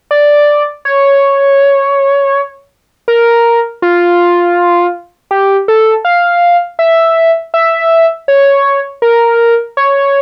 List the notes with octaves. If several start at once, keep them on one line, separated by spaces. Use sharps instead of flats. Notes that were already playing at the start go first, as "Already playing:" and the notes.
D5
C#5
A#4
F4
G4
A4
F5
E5
E5
C#5
A#4
C#5